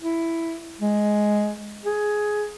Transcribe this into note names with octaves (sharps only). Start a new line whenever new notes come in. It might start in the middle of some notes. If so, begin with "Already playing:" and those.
E4
G#3
G#4